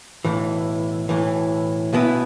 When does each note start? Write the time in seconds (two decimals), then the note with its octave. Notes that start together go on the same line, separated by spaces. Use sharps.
0.25 B1 A2 E3
1.09 B1 A2 E3
1.93 B1 B2 B3 E4